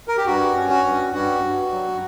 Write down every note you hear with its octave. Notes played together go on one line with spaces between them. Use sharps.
A#4
G4
G2 F#4
C#4
F#4
G2
G2 F#4
G2
F#3